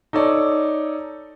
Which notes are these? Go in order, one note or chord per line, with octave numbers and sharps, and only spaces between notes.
D#4 A4 C#5 D5